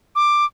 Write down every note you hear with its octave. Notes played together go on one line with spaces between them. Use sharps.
D6